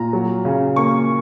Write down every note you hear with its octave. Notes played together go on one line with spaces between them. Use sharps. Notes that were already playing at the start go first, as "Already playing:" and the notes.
Already playing: A#2 A#5
F#3
C#3
A#3 C#6